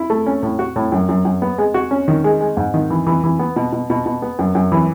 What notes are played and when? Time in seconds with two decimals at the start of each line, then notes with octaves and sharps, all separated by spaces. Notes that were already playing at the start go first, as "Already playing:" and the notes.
Already playing: E4
0.10 A3
0.26 C#4
0.43 A2
0.59 F#4
0.76 A2
0.92 F#2
1.09 F#2
1.25 F#2
1.42 B3
1.58 G#3
1.74 F#4
1.91 C#4
2.08 D#3
2.24 G#3
2.41 G#3
2.57 G#2
2.74 D#3
2.90 E3
3.07 E3
3.24 E3
3.39 B3
3.56 B2
3.73 B2
3.90 B2
4.06 B2
4.22 B3
4.39 F#2
4.55 F#2
4.72 E3